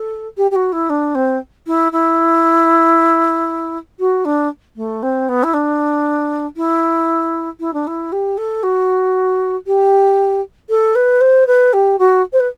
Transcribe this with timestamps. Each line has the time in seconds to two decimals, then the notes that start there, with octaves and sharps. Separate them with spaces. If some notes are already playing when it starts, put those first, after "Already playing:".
Already playing: A4
0.37 G4
0.51 G4
0.56 F#4
0.72 E4
0.90 D4
1.15 C4
1.67 E4
1.92 E4
4.00 F#4
4.25 D4
4.76 A3
5.03 C4
5.29 B3
5.44 E4
5.54 D4
6.57 E4
7.60 E4
7.74 D4
7.87 E4
8.12 G4
8.38 A4
8.63 F#4
9.67 G4
10.69 A4
10.95 B4
11.21 C5
11.47 B4
11.73 G4
11.99 F#4
12.33 C5
12.40 B4